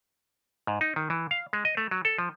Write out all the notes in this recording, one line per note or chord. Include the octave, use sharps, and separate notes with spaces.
G#2
D#4
D#3
E3
F5
G#3
D#5
A3
F#3
A4
F3